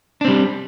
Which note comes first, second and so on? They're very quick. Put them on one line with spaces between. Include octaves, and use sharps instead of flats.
D4 C4 G3